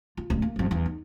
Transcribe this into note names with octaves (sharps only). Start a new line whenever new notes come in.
F4
D1 C#2
A#3
G1 F2
E2
D#4